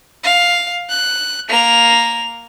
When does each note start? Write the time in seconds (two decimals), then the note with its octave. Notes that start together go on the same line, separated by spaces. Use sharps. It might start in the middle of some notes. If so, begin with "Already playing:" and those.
0.24 F5
0.89 F#6
1.49 A#3 F7